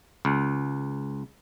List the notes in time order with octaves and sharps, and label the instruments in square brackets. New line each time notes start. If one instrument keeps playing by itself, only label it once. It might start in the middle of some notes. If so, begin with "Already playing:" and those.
[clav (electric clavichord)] C#2